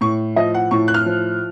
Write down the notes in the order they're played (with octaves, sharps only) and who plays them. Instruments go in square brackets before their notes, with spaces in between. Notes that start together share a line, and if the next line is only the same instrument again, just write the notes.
[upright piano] A2 C#6
F3 D#5
F#5
A2 C#6
F#6
F6
F3